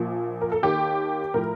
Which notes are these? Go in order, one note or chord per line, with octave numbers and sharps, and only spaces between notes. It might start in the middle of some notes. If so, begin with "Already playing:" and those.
Already playing: A#1 A#2 F3
A#4
A4
D#2 D#3 G4
A2 F3 A#4